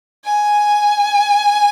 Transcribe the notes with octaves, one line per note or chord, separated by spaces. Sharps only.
G#5